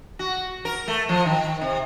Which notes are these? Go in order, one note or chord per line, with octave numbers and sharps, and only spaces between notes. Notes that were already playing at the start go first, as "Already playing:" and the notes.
F#4
A#4
A3
F3
D#3
C3